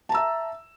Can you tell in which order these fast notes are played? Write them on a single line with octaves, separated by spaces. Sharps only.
A5 A#5 E6 E5